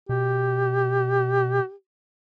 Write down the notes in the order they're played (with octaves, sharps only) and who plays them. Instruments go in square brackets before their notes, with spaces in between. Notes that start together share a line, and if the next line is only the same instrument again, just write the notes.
[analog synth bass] B2 [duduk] G4